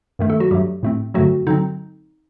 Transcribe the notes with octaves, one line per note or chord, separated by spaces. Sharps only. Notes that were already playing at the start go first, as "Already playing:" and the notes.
G2 D#3 A3
A3 A4
F#3 F#4
G2 F#3 G3 A3 G4
A2 A3 C4
G2 D3 F#3 A3 C4 F#4
D3 F#3 C4 D#4